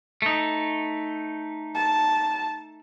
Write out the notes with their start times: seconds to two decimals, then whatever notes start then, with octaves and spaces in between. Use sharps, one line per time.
0.22 A3 D#4
1.75 A5